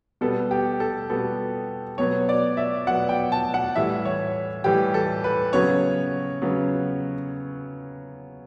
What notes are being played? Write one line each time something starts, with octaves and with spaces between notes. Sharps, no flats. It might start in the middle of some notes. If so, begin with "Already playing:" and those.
B2 G3 B3 A4
G4
A4
B2 G3 B3 A4
B2 F#3 B3 C#5
D5
E5
B2 F#3 B3 F#5
G5
A5
F#5
A2 E3 G3 E5
C#5
A2 E3 G3 G4
A4
B4
C#3 F#3 B3 C#5
C#3 F#3 B3